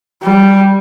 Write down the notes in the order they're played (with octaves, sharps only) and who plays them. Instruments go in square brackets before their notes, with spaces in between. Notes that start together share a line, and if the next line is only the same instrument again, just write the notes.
[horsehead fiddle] G3